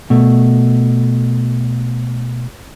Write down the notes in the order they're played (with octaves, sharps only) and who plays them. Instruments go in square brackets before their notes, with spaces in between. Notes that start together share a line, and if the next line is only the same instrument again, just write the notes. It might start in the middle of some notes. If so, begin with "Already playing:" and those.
[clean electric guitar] B2 A3